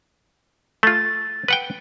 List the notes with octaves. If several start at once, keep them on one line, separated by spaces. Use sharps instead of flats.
A3 F4 A6
B4 F#5 G5